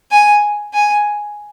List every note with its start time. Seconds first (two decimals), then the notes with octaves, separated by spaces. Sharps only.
0.11 G#5
0.74 G#5